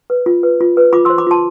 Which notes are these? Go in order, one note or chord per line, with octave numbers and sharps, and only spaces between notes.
B4
F4
B4
F4
B4
F4 B5 D6
C5 C6 E6
B5 D6
F4 A5 C6